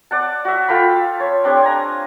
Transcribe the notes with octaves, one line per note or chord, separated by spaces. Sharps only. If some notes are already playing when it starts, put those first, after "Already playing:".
D5 F#5 A5
F#4 E5
F4 A4 G5 B5
C#5
C4 D4 G4 C#5
G#5 A#5